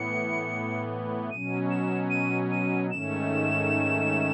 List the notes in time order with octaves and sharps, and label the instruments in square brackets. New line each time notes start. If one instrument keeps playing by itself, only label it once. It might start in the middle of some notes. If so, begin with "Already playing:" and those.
Already playing: [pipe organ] A2 E3 B3 [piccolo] C#7
[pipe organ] B2 F#3 C#4 [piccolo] D#7
[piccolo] E7
D#7
D#7
[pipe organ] G#2 D#3 A3 C#4 [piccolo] E7